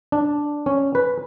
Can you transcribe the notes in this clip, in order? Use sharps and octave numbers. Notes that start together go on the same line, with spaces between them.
D4
C#4
B4